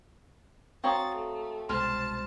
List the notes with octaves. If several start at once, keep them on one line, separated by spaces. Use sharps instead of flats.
C4 F#4 C#5 F5 A#5 D#6 A6
A3
C2 B2 G#3 C5 A5 C6 F6 F7